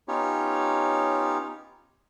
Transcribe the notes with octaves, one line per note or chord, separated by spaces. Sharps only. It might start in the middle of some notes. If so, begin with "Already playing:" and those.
B3 C#4 D#4 F4 G4 C#5